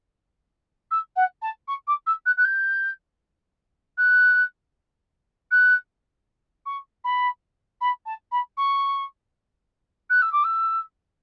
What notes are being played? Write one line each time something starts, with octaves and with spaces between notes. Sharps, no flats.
E6
F#5
A5
C#6
D6
E6
F#6
F#6
G6
F#6
F#6
C#6
B5
B5
A5
B5
C#6
F#6
E6
D6
E6